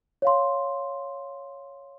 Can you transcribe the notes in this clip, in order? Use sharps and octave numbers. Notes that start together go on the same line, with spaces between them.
C#5 F5 C6